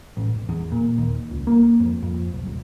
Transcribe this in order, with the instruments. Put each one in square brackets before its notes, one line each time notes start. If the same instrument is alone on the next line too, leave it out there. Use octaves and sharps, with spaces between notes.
[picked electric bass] A1
E1
E2
A#2
D#2
C#2
A#3
F2
F2
B1
D#1